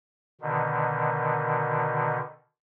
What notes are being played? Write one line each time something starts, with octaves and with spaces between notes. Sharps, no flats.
B2 D3 D#3